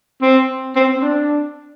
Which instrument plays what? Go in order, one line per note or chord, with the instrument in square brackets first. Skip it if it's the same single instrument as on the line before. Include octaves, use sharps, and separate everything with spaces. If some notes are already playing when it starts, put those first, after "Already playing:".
[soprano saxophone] C4
C4
C4
D4